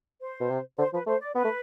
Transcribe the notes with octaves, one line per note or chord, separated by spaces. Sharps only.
C5
B2
C3
D3 C5
F3 B4
A3 C5
D5
B3 B4
A3